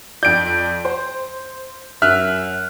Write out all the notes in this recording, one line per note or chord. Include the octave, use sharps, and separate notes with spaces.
F2 D5 G6 D7
C5
F#2 E5 F6 F#6